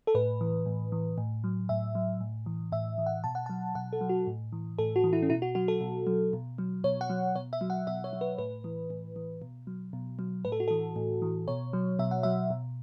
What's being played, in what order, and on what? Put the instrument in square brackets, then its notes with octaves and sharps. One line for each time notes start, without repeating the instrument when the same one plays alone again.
[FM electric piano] A4
A2 B4
E3
A2
E3
A2
F#3
A2 E5
F#3
A2
E3
A2 E5
E3
F#5
B2 A5
F#5
F#3 A5
B2 F#5
A4
F#3
F#4
A2
E3
A2 A4
F#4
E3
E4
C#4
B2 E4
F#4
F#3 F#4
A4
B2
F#3
B2
F#3
B2 C#5
F#5
F#3
B2 C#5
E5
F#3
F#5
B2 E5
C#5
F#3
B4
A2 B4
E3
A2
E3
B2
F#3
B2
F#3
A2 B4
A4
F#4
E3 A4
A2
E3
B2 C#5
F#3
B2 E5
F#5
F#3 E5
B2